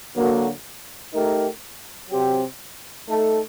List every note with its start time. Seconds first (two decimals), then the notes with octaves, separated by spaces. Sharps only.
0.15 D3 F#3 A#3 F#4 A4
1.13 A3 D#4 G4 A#4
2.09 C3 F#3 C4 G4
3.06 A3 D#4 A4